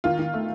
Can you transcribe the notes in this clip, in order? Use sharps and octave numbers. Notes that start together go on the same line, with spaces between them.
D#3 F4
D#3
A3